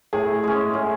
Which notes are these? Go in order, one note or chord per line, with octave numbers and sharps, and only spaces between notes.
A2 G#4
G#3 C#4
A2